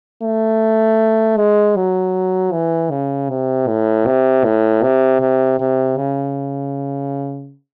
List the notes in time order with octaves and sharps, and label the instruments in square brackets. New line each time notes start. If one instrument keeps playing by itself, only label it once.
[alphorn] A3
G#3
F#3
E3
C#3
C3
A2
C3
A2
C3
C3
C3
C#3